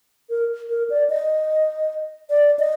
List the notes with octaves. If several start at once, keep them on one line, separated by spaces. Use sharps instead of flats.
A#4
A#4
D5
D#5
D5
D#5